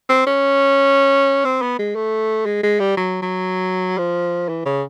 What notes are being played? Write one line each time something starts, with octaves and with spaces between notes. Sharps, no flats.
C4
C#4
C4
B3
G#3
A3
G#3
G#3
G3
F#3
F#3
F3
E3
C#3